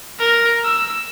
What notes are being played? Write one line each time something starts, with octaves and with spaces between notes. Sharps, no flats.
A#4
E6